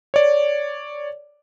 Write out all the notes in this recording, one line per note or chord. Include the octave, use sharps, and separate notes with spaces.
C#5 D5